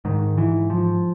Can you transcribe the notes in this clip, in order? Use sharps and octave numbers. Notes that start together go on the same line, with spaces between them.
G#2 D#3
E3
F3